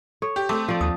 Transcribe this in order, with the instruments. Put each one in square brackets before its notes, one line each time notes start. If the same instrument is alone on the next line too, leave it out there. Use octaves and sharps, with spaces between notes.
[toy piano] A4 [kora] C#5
[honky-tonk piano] G4
[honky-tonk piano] A3 [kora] C4 [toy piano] D6
[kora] F3 D5
[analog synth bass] D#2 [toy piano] A5 D#6